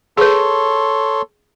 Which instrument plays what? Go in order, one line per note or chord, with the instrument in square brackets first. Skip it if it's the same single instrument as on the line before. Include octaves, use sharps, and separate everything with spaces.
[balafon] G#4 B4 [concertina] A4 C#5 C6